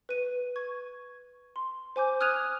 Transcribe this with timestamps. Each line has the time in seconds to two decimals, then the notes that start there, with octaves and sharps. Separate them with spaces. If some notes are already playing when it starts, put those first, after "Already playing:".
0.09 B4 D#7
0.56 C#6 G#6
1.56 C6
1.96 C5 G#5 D6 G6
2.20 D#6 F6 F#6 G#6 D#7 F7